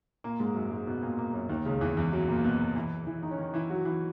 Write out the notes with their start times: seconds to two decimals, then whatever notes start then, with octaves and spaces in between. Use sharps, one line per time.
0.24 A#2 A#3
0.40 G#2 G#3
0.55 F#2 F#3
0.70 G#2 G#3
0.87 B2 B3
1.02 A#2 A#3
1.18 A#2 A#3
1.33 F#2 F#3
1.49 D#2 D#3
1.66 C#2 C#3
1.81 E2 E3
1.97 E2 E3
2.12 F#2 F#3
2.28 A#2 A#3
2.44 B2 B3
2.76 E3 E4
3.06 E3 E4
3.22 D#3 D#4
3.31 C#4
3.38 D#3 D#4
3.54 E3 E4
3.70 F#3 F#4
3.85 E3 E4